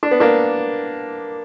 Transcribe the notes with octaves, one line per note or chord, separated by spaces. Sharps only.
D4
B3
A#3 D4